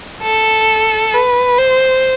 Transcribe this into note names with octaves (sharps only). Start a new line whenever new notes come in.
A4
B4
C5